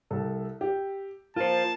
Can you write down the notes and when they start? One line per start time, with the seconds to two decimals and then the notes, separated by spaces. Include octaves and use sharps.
0.10 C2 A4
0.61 G4
1.36 A#3 F4 C5 A5